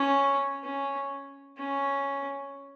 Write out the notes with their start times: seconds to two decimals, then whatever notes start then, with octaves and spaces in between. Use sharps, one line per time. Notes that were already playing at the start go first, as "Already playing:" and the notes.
Already playing: C#4
0.63 C#4
1.58 C#4